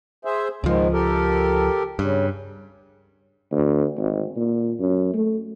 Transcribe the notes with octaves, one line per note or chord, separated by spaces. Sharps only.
G#4 C5 E5
C#2 G#2 D#3 F3 G#3
G4 A4 A#4
G2 C#3
D2
G#1
A#2
F#2
A3